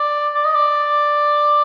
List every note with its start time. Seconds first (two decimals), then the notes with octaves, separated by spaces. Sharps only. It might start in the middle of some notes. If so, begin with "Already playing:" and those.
Already playing: D5
0.35 D5
0.45 D#5
0.55 D5